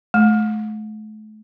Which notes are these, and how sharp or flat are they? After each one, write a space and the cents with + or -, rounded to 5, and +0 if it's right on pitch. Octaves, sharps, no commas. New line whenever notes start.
A3 -35